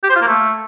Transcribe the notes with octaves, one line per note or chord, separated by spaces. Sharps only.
G4
C5
F4
A#3
A3